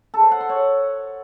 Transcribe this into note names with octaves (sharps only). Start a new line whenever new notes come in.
A4
C5
F#5
C6
C#5